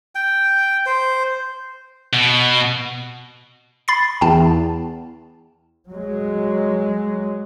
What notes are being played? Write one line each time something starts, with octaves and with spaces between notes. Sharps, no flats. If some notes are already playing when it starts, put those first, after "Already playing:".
G5
C5
B2
B5 A6 C7
E2 G5 A5
F#3 G#3